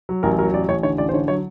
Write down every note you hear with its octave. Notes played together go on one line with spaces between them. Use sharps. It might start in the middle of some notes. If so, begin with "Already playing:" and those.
F#3
A1 A#4
F#3 A#4
A1 D5
A1 C#5
D3 C#5
A1 D5
C5
D3 C#5
F#3 C#5